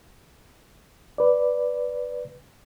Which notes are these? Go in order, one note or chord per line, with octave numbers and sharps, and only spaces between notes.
B4 D5